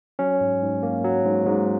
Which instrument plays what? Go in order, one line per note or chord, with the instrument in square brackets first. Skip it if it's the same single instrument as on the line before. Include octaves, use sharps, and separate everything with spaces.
[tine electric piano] F#3 C#4
G#2
G#2
A#3
F#3
G#2
G#2